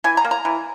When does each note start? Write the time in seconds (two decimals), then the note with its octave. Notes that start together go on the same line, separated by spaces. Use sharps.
0.04 E3 G#5
0.17 A#5
0.25 A#3
0.31 A#5
0.45 E3